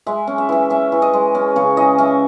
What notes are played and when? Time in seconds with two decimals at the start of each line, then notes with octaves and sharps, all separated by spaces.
0.06 G#3 E5
0.27 C#4
0.38 E5
0.49 E3 E5
0.70 C#4 E5
0.92 E3
1.02 D#5
1.13 G#3
1.35 C#4
1.56 C#3 C#5
1.77 E3 D#5
1.98 C#4 E5